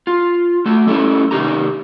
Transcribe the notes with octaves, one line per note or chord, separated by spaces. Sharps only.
F4
A3 D4 F#4
G3 A3 C#4 E4 A4
C3 D#3 E3 D#4 G4 A#5